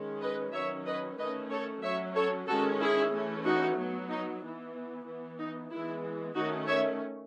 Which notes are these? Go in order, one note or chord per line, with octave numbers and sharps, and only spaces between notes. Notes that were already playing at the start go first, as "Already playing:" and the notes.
Already playing: D#3 G#3 C#4
B4 D#5
D#3 F#3 C#4 C#5 E5
B4 D#5
D#3 A3 C#4 B4 D#5
A4 C#5
F#3 C#4 C#5 E5
A4 C#5
D#3 G#3 C#4 F#4 A4
E4 G#4
E3 A3 C#4
D#4 F#4
F#3 B3
D#4
E3 B3
E3 B3
D#4
E3 G#3 B3 E4
D#3 A3 C#4 D#4 F#4
C#5 E5